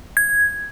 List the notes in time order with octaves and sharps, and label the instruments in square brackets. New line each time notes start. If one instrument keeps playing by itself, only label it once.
[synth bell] G#6